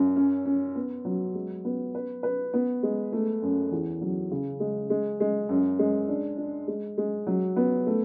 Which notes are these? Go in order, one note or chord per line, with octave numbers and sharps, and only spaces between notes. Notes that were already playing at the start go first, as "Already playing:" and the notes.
Already playing: F#2
C#4
C#4
B3
F#3
G#3
B3
B4
B4
B3
G#3
A3
F#2
E2
F#3
C#3
G#3
G#3
G#3
F#2
G#3
D4
D4
G#3
G#3
F#3
B3
A3